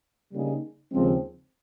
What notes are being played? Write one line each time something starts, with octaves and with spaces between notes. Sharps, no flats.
C#3 G3 A#3 D#4 G#4
D#2 C#3 F3 G#3 C4